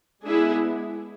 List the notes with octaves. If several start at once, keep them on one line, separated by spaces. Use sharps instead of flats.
G#3 B3 D4 E4 G#4